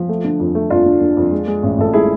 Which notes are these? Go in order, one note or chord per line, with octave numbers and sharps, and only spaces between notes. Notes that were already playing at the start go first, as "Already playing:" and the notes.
Already playing: F3
A3
D3
F2
A3
F2 D4 F4
D3
D3
F2
G#3
G#3
A1
A1 A4
G#3 E4 G#4